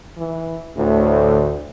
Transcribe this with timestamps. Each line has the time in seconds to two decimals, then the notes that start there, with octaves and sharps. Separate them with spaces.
0.17 E3
0.77 D2 A2